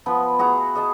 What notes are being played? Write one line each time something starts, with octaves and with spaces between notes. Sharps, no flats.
F3 B3 B4
E4 F#4 G#4 A#5
G#4 D#5 A5